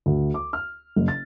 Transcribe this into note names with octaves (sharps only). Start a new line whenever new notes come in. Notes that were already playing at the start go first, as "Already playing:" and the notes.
D2
D6
F6
F#1
A6